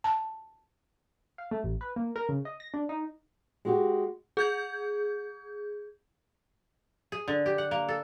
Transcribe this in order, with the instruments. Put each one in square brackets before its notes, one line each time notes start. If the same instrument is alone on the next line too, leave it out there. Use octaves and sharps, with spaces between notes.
[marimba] A5
[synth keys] F5
A3
A1
B4
A#3
A#4
C#3
D#5
A#6
D4
D#4
[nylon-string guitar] G#3 F#4 G4
[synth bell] G#4 G6 G#6
[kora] G#4
D3
G4
F#5
A#3
A4